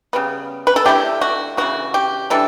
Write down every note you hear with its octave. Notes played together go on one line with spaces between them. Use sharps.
C#3 G3 B3
B4
A4
D3 A3 C#4 E4 G4
F#4
C#3 E3 B3 F#4
G4
E3 G3 D4 A4